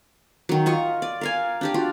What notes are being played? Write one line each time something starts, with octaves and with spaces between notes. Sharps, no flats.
D#3 F#3
F4 D#5 C#6
D5
A#4 F5 G#5
D4 G4 D5
F4 F#4